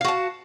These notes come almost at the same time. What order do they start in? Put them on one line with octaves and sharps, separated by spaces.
F5 F#4 A5